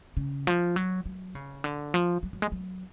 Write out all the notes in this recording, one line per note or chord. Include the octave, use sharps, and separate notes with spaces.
C#3
F3
F#3
F#3
C#3
D3
F3
F#3
F#3
G#3
F#3